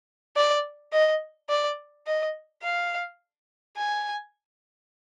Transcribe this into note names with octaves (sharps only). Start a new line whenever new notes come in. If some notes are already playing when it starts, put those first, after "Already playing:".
D5
D#5
D5
D#5
F5
G#5